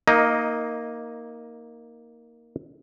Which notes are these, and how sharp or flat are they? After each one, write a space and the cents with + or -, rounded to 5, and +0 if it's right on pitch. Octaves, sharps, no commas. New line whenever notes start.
A#3 +0 D#4 +20 D#5 +0